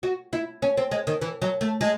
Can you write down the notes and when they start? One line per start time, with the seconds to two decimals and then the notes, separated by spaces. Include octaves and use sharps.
0.03 F#4
0.33 E4
0.62 C#4
0.77 C4
0.91 G#3
1.07 D#3
1.21 E3
1.42 F#3
1.61 A3
1.81 G#3